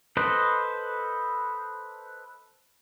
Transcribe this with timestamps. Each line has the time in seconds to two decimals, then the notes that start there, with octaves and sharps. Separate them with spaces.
0.17 A4 B4 C5 D#5